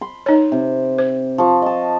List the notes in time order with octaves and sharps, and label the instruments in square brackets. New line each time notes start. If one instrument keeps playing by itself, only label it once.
[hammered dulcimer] B5 C6
[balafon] D#4 C#5
[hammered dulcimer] C3
[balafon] C5
[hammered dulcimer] F3 C#6
D#5 A5